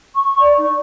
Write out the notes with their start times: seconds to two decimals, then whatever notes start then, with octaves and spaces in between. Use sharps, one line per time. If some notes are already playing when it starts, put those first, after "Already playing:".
0.15 C#6
0.39 D5
0.57 D#4